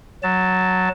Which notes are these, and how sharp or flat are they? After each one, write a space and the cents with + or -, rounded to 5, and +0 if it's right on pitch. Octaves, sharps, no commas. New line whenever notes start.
F#3 +0 A5 +0